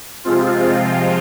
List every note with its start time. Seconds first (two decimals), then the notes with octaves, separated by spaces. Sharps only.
0.24 C3 F3 G#3 C4 F4